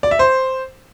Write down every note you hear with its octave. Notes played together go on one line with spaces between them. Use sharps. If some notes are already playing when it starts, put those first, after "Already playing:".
D5
E5
C5